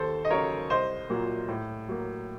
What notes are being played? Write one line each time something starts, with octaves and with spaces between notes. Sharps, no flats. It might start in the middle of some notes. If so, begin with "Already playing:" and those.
Already playing: D#2 A4 C5
D#5
C#3 F#3 A#4 C#5
C2 C5 D#5
A#2 F#3 A#3
A2
F#3 A#3